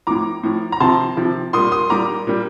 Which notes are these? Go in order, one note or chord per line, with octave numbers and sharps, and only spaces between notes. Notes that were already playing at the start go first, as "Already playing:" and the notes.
A2 F3 A#5 D6
A2 F3
A#5
C3 F3 A5 C6
C3 F3
A#2 G3 C6 D#6
C6 D#6
A#2 G3 A#5 D6
A#2 G3